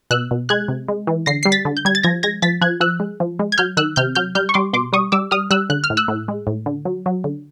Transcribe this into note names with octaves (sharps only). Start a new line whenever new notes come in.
B2 E6 F#6
B2
G#3 F#6 G#6
C3
G#3
E3
D3 A#6 C7
G3 C7
A6 B6
D3
G6
G3 G#6
A6
F3 G#6 A#6
G#3 G#6 A#6
F3 A6 B6
F3 F#6 G#6
F3 E6 F#6
G#3
F3
G#3
G#6
F#3 F6 G6
D#3 E6 F#6
C3 F6 G6
F#3 F6 G6
G3 F6 G6
C#6
G3 C6 D6
B2 C6 D6
G3 C#6 D#6
G3 D6 E6
G3 D#6 F6
G3 E6 F#6
D3 F#6
F6
A2
E6 F#6
A2
G#3
A2
D3
F#3
F#3
D3